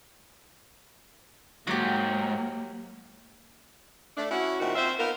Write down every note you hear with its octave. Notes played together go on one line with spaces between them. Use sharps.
G#2 F#3 A#3 G4
A3 D4
C#4 E4 F#4
A#2 D#3 C4 F#4 E5
C4 F4 C5 E5
B3 D#4 F4 A#4